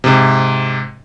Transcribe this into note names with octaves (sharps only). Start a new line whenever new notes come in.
G#2 C3